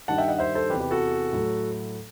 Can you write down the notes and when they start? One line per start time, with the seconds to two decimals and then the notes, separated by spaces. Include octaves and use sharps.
0.08 G2 D#3 G3 F#5 A5
0.18 E5 G5
0.28 D#5 F#5
0.39 C5 E5
0.55 A4 C5
0.70 E2 C3 E3 G4 B4
0.80 G4 B4
0.91 F#4 A4
1.33 A2 F#3 A3